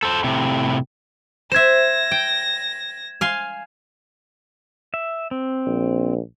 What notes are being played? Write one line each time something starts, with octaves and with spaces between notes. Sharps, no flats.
A4 C5
A2 C3
C5 E5 G#6 A#6 E7
G5
F5 G#5 C6
E5
C4
A#1